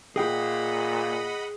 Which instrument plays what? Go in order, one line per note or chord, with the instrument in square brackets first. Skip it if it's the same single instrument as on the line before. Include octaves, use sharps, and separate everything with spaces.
[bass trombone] A#2 [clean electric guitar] G#4 G5 [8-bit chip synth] D#5 F#5 B5